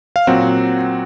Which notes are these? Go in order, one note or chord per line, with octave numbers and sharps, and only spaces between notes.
F5
A#2 F#3 C4 F#5